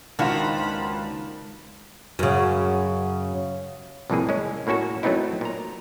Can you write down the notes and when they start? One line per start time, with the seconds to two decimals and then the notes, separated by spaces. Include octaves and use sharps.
0.19 C#2 D#3 A#3 D4 F4 F#4 C5 B5
2.19 F#2 C#3
4.10 C2 F2 A2 E3 A#3 G#4
4.29 G#3 C#4
4.67 A2 A#3 C#4 F#4 A4
5.03 F#3 A3 B3 C4 D#4 E4
5.41 A#2 A#5